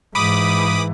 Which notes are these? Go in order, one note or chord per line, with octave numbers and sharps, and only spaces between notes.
G#2 E3 B5 D6 D#6